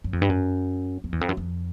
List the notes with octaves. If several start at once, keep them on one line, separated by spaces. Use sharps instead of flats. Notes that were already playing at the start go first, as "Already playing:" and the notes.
F#2
F2
G2
F#2
F2
E2
F2
F#2
F2